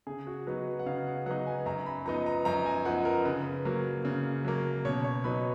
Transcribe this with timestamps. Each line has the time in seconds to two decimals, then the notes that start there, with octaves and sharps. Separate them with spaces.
0.07 C#3 G#4
0.27 F#4
0.47 F#3 B3 D#4 F#4
0.79 F#5
0.86 C#3 F5
1.07 F#5
1.26 F#3 B3 D#4 F#5
1.47 G#5
1.66 F#2 A#5
1.86 B5
2.06 F3 B3 D#4 A#5
2.26 A#5
2.45 F#2 A#5
2.66 G#5
2.85 F3 B3 D#4 F#5
3.05 A#4
3.25 C#3 B4
3.65 F#3 A#3
4.05 C#3
4.45 F#3 A#3
4.85 B2 C#5
5.04 C#5
5.24 F#3 B3 D#4 B5